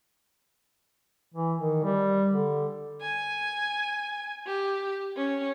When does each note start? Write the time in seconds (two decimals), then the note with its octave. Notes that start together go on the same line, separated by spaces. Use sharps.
1.34 E3
1.59 D#3
1.84 G3
2.30 D3
3.02 G#5
4.46 G4
5.17 C#4